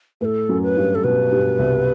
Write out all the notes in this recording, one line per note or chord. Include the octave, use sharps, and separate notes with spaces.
A2 A3 A4 B4
F#2 F#3
B4
G2 G3
A4
B2 B3 B4
G2 G3
C2 C3